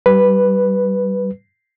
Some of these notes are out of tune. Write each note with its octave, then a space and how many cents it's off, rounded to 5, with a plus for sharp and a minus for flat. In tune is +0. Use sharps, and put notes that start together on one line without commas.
G3 -25 B4 +0